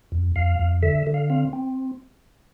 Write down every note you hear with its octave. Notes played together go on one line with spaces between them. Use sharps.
F2
F2 F5
F2
D3 E5
D3
F5
C4 F5
C4